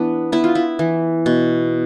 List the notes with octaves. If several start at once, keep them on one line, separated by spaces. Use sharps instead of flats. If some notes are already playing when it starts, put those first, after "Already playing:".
Already playing: E3 B3 D4
B3 E4
F4
E4
E3
B2